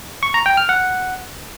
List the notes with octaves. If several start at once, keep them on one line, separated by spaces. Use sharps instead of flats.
C#6
A#5
G5
F6
F#5